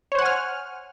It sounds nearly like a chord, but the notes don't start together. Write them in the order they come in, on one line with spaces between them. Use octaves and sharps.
C#5 C5 F#5 G#5 F6